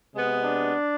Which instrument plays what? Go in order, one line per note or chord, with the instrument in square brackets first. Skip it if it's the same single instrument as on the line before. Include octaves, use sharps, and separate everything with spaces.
[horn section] C3 G#3 B3
D4